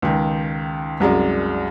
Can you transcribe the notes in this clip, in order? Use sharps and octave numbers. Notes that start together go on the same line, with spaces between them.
C#2 D#3
C2 F#2 G#3 D5